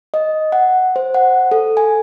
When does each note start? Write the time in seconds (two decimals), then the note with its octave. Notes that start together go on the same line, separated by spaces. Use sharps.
0.14 D#5
0.52 F#5
0.96 C5
1.14 F#5
1.52 A4
1.77 G#5